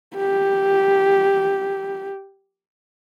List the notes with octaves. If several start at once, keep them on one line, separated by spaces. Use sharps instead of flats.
G4